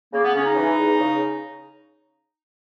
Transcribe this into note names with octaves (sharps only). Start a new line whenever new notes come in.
C#3 A#3
B3
C#3 C#4
D#4
E3
E2
C#3